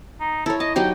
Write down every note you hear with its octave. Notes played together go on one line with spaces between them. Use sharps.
D#4
E4 A4 C#5
D#5 A5
F#3 D#4 G4 G5